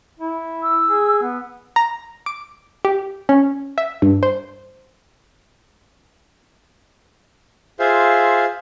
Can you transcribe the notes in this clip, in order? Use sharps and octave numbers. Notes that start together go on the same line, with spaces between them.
E4
E6
G#4
B3
A#5
D6
G4
C#4
E5
G2
C5
F4 G#4 C5 E5 F5